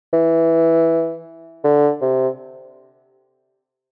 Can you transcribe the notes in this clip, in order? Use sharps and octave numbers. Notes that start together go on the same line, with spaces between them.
E3
D3
C3